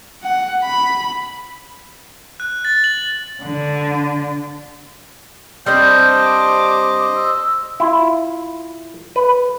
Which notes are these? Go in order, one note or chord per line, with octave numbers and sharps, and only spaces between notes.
F#5
B5
F#6
A6
F#7
D3
G3 C4 D4 C5 D#5 G6
D6
E6
E4 F4
B4